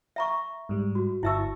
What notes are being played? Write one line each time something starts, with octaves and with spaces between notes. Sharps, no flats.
E5 A#5 C#6
G#2 G3
F#4
G1 E4 E5 A5 C#6 E6